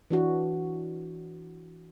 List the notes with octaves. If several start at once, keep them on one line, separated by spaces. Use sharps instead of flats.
E3 D4 F#4